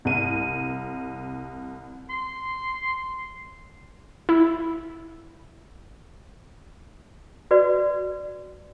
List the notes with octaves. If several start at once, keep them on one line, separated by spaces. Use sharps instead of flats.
C2 D#7
C6
E4
F#4 B4 D5